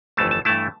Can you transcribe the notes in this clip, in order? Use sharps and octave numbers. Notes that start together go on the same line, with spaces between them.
G1 F2 E3 A3 A5
A5
G2 E3 A3 E4 A5